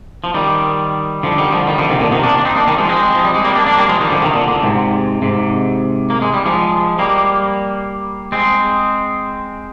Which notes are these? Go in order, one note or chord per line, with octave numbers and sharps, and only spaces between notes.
F3
D#3 G3
D3 F3
D#3 G3
D3 F3
D#3 G3
D3 F3
C3 D#3
A#2 D3
C3 D#3
A#3 D4
D4
C4 D#4
A#3 D4
D#3 G3
F3 G#3
G#3 C4
F3
G3
G#3
G3 A#3
A#3 D4
A#3 D4
G3 A#3
F3 G#3
D#3 G3
D3 F3
C3 D#3
A#2 D3
A#2 D3
G#2 C3
G#2 C3
A#3
G#3
G3
F3 G#3
G3 A#3
G#3 C4